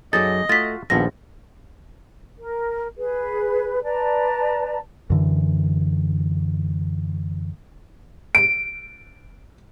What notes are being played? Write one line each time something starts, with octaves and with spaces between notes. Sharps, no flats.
F#2 F#3 D#4 G#4 A4 D5 D#5 A6
A3 F4 F#4 A6 B6
A#1 D#2 F3 B3 A4 A#6
A#4
G#4 B4
B4 D5 A5 A#5
F#2 D3 E3
D7